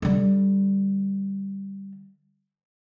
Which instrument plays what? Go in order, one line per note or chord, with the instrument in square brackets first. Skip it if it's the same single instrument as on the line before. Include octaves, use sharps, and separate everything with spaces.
[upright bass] D3 G3